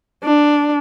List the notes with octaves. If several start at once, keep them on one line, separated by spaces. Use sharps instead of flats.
D4